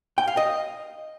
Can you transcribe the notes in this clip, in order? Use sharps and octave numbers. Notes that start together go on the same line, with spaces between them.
G5
F5
D#5